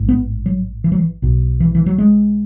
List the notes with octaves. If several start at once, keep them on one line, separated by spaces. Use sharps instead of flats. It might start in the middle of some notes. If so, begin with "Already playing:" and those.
Already playing: A1 G#2
B3
F#3
E3
F#3
E3
B1 B2
E3
E3
F#3
G#3